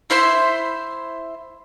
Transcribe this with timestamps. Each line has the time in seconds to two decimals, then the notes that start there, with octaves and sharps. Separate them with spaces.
0.10 E4 C5 E5 C6